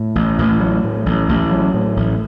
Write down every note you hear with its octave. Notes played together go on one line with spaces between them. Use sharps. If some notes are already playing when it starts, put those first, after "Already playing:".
Already playing: A2
A1
A1
F#3
A2
A1
A1
F#3
A2
A1